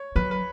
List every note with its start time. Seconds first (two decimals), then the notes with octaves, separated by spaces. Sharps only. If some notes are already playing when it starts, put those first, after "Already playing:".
Already playing: C#5
0.16 F#3 B4
0.31 B4